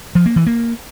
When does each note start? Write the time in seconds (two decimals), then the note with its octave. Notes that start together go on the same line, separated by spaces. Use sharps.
0.15 F3
0.26 A#3
0.36 E3
0.47 A#3